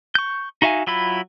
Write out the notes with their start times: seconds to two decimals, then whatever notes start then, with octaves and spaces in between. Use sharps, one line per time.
0.15 C#6 G6
0.62 D#4 F#4 E5 F5 G#5
0.87 F#3 E4 F4 B5